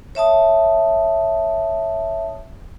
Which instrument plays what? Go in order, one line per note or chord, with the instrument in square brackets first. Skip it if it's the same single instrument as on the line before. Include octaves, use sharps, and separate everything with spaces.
[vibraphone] C#5 E5 A5 D#6